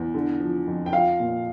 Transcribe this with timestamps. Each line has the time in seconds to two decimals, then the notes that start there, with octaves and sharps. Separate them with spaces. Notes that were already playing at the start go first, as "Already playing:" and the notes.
Already playing: E2
0.14 D3
0.40 F3
0.67 F2
0.86 G5
0.93 F3 F5
1.20 A#2